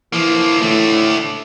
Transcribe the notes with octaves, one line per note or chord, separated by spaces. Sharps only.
E3 F3 A#3
A2 D3 A3